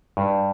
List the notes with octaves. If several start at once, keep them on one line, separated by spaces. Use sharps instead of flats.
G2